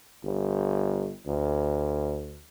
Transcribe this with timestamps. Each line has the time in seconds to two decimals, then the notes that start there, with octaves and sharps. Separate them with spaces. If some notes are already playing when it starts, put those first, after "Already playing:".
0.24 G1
1.26 D2